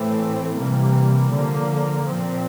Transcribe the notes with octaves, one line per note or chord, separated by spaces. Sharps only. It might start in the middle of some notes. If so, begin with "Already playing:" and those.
Already playing: A2 E3 A3 C4
C3 E3 G3 A#3
D3 F3 A#3
A#2 F3 C4